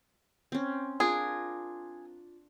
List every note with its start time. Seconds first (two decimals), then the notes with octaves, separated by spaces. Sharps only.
0.52 C4 C#4
1.00 D4 F4 G#4 A#4